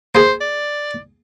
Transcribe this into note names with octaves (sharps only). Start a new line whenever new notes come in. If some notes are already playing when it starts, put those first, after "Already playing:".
A#3 G#4 C5
D5